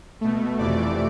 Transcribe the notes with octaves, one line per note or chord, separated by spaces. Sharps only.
B2 A3
F2 C3 E3 A3 D5 D6